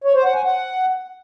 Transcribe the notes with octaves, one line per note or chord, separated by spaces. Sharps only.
C#5
C5
F#5
G#5
F#5